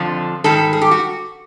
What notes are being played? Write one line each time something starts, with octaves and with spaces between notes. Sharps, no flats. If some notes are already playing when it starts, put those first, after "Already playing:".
Already playing: F2 D3 F3
G#2 D#3 G3 A4
G#4
G4
F#4